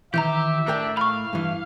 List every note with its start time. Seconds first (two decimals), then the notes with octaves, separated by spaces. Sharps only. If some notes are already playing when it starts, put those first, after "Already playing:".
0.14 D#3 E3 G4 E5 A#5 G6
0.67 A2 D4 A#4 G5
0.97 F5 B5 C#6
1.33 G2 E3